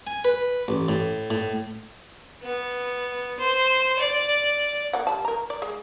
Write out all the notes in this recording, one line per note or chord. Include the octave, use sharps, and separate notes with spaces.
G#5
B4
A1
A2
A2
B3
C5
D5
A#3 D5 F#5
G3 A5
A#4 A#5
D5
G#3